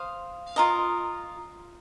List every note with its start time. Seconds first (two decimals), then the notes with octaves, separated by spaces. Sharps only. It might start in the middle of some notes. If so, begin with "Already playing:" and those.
Already playing: C5 F5 D#6
0.56 F4 A#4 D#5